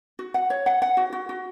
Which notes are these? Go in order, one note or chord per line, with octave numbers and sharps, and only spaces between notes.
F#4
F#5
C#5
F#5
F#5
F#4
F#4
F#4